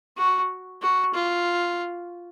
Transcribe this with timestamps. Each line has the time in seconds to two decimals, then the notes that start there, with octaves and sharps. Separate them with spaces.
0.17 F#4
0.82 F#4
1.14 F4